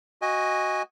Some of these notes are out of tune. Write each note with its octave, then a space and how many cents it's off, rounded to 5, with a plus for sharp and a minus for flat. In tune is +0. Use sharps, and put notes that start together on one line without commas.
F#4 +0 D#5 +5 G#5 -20